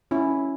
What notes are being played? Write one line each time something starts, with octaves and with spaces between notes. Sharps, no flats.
C#4 E4